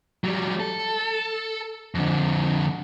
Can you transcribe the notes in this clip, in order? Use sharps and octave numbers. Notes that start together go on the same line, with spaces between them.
F#3 G3
A4
F2 D3